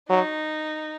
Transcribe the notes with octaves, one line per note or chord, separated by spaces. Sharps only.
F#3 D#4